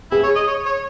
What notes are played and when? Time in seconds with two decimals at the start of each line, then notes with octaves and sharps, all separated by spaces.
0.12 E4 G#4
0.24 C#5
0.36 D#5
0.47 C#5
0.66 C#5